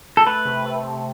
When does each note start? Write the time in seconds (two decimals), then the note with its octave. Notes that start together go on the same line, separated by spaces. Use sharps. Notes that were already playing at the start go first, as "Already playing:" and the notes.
0.17 A4
0.26 A3 B4
0.45 C3
0.65 A3
0.83 C3